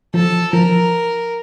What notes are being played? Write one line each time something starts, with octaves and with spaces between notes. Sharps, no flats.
F3 A4
F3 A#4